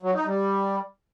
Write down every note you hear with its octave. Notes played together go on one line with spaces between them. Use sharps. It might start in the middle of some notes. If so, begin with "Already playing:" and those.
F#3
D#4
G3